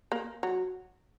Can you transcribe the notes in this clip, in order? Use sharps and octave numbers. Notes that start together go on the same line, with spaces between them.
A#3
F#3